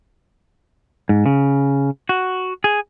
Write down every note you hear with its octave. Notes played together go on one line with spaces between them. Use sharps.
G#2
C#3
F#4
G#4